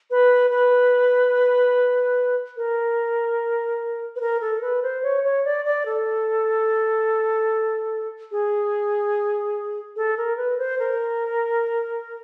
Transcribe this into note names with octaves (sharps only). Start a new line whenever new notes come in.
B4
B4
A#4
B4
A#4
A4
B4
C5
C#5
C#5
D5
D5
A4
G#4
A4
A#4
B4
C5
A#4